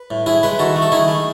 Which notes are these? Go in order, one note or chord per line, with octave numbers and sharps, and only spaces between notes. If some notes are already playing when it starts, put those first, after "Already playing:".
Already playing: B4
A2
A2 E4 G#4
G#3 G#4 B4
D#3 F#4 A4
A3
A4
D#3 E4 G#4
A3